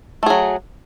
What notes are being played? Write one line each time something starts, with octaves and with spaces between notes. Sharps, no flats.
F#3 A3 G#4